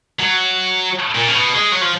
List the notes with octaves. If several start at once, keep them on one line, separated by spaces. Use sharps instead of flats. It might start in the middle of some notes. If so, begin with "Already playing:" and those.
F#3
A#2
C#3
B2
G#3
F#3
F3